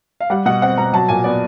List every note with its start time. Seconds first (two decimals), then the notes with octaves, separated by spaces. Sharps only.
0.20 F5
0.30 G3 F#5
0.46 B2 F#5
0.62 C4 F#5
0.77 B2 A#5
0.93 F#3 A5
1.09 A#2 G#5
1.24 B3 D5